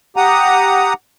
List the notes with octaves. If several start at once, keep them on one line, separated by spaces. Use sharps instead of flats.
G4 F#5 A#5 D#6